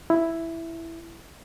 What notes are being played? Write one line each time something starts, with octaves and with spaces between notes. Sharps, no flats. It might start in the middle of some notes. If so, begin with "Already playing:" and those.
E4